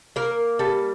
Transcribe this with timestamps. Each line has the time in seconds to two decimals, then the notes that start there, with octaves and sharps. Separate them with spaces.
0.16 A#3 A#4
0.59 G3 A4